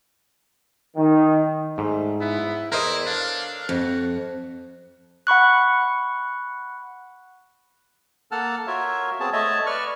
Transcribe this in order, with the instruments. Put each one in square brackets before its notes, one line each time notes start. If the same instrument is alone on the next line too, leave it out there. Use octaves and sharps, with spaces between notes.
[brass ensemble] D#3
[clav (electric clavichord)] G#2 [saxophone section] G3 A3
[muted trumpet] B3 [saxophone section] E4
[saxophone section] E2 [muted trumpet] E4 [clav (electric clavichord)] A#4 C5 D#5
[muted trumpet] D4 [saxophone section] A4 C#5 F5
[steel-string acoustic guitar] F2 [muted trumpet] F#4
[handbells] F#5 B5 C#6 F#6
[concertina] A#3 A4 F#5 A5 F6
F4 F#4 A#4 C#5 E5
B3 C4 G#4 C#5 A5
A3 C#5 D#5 E5 A5
B4 D5 C#6 F6